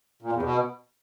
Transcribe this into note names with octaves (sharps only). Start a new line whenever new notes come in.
A#2
E2
B2